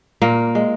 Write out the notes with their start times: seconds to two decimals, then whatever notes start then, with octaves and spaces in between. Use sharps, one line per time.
0.22 A#2 A#3
0.55 G#3